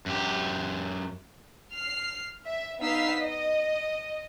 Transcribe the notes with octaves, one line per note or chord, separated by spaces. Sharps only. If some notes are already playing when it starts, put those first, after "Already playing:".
F#2 G4
F6 C7
E5
B3 D#4 F5 E6 B6 C7
D#5